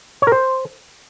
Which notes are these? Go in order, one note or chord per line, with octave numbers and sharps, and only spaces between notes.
C#5
A#4
C5